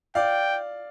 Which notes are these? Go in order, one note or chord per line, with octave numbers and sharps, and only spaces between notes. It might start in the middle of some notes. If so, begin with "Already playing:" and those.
D5 F5 G5